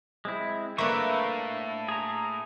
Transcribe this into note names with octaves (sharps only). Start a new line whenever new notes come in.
G#3 C4 E4
A2 A3 A#3 D4 B4 E5 C#6
G#4 A#5